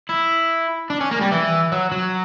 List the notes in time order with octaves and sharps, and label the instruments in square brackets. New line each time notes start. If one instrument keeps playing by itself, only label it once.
[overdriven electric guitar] E4
D4
C#4
A#3
G3
E3
F#3
F#3